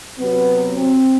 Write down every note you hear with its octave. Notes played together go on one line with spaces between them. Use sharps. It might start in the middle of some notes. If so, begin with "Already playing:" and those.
C3 F#3 B3
C4